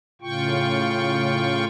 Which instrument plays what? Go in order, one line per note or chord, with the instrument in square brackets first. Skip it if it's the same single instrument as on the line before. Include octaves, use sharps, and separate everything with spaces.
[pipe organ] A2 C#3 F4 G5 C#6